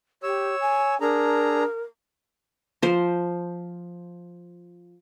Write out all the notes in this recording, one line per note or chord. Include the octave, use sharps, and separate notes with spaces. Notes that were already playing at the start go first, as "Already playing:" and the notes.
G4 C#5 E6
G#5
D4 G#4 A#4 A#5
F3 C5